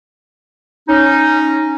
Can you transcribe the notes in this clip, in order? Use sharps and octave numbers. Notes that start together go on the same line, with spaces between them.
C#4 D#4